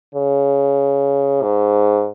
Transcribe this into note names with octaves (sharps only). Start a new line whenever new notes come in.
C#3
G#2